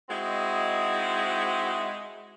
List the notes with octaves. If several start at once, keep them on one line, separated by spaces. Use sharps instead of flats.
G#3 C4 D#4 E4 F#4